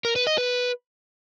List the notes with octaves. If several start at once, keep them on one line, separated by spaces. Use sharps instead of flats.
A#4
B4
D#5
B4